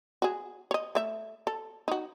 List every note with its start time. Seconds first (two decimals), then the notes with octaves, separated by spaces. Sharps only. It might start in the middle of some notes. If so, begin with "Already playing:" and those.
0.22 F#4 G#4
0.71 C#5 D#5
0.95 A3 E5
1.47 A4
1.88 D#4 F#4